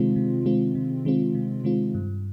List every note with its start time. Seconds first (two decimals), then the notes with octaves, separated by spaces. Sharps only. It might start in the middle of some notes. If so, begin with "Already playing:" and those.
Already playing: C3 D#3 G#3 C4 F4
0.16 C3
0.46 D#3 G#3 C4 F4
0.75 C3
1.05 D#3 G#3 C4 F4
1.35 C3
1.64 D#3 G#3 C4 F4
1.94 G2